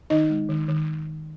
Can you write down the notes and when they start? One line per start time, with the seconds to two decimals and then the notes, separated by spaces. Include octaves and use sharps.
0.10 D#3 D#4 D#5
0.30 G#3
0.49 D#3
0.68 D#3